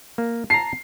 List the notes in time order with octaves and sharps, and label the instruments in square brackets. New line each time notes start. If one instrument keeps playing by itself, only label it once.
[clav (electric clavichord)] A#3
[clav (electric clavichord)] A5 A#5 [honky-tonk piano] C7